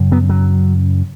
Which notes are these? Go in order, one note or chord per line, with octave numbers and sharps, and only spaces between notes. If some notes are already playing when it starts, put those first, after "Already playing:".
Already playing: F#2 C#3
F#3 B3
F#3